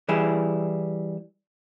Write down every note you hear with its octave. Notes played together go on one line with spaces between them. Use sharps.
E3 G3 E4 G#4